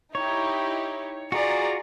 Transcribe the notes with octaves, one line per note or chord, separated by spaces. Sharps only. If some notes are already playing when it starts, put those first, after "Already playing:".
D#4 E4 G4 C#5
F4 F#4 G#4 D5 A#5